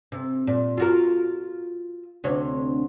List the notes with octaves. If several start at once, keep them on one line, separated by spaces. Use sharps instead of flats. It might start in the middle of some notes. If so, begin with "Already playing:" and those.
C3
A#2
F4 F#4 A#4
D2 C3 C#5